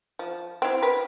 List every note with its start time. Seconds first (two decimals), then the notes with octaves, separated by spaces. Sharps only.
0.19 F3
0.62 C4 E4
0.83 A#4 B4